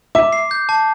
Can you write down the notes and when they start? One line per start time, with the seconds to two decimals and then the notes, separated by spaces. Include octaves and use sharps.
0.15 E5 D6
0.32 C7
0.51 G6
0.69 A5